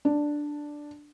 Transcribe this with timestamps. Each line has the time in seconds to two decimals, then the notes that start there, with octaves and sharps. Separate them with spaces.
0.05 D4